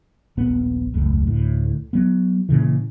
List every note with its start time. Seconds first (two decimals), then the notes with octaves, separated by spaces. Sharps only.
0.37 D#1 A#1 B3
0.94 E1 C#2 F#2 A3
1.27 D2 A2
1.93 F#3 B3
2.49 A#2 C#3 E3